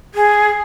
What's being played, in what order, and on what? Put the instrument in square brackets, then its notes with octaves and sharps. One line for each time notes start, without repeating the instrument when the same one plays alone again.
[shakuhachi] G#4